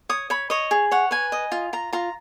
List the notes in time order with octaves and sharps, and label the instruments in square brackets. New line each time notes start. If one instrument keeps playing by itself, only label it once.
[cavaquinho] C#5 D#6
C#5 B5
C#5 D#5
G#4
C#5 F#5
B4 G#5
D#5
F4
F4 A#5
F4 A#5